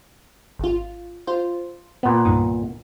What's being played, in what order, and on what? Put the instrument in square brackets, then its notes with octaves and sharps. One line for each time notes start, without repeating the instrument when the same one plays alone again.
[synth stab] G#1 F4
F4 C5
[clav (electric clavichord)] A#2 B3
[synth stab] C2 G2 D#3